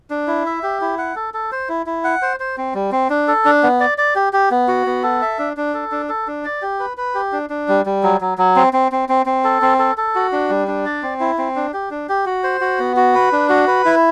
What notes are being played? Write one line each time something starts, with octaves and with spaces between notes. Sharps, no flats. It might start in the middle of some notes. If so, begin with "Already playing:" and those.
D4
E4
E5
G4
E4
F#5
A4
A4
C5
E4
E4
F#5
C5
C5
C4
G3
C4
D4
A4
D4
B3
D5
D5
G4
G4
B3
F#4
B3
A4
E5
D4
D4
A4
D4
A4
D4
D5
G4
B4
B4
G4
D4
D4
G3
G3
F#3
F#3
F#3
C4
C4
C4
C4
C4
A4
C4
A4
A4
F#4
D4
G3
D4
D5
C4
E4
C4
D4
G4
D4
G4
F#4
C5
F#4
B3
F#4
B4
D4
F#4
B4
E4